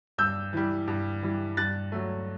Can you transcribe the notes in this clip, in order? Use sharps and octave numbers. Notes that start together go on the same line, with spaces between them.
G2 E6 G6
E3 G3
G2
E3 G3
G2 F#6 A6
F#3 A3